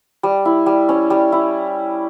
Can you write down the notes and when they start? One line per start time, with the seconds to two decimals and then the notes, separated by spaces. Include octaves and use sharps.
0.23 G3
0.45 E4
0.66 G3
0.89 C#4
1.10 G3
1.32 E4